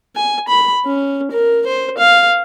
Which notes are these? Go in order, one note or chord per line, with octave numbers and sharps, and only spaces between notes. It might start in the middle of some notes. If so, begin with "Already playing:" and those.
G#5
B5
C#4
A#4
C5
F5